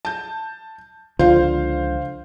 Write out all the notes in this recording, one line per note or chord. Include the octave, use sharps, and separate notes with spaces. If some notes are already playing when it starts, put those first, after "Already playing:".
A5 G6
C#2 D3 F3 D4 F4 C5 F5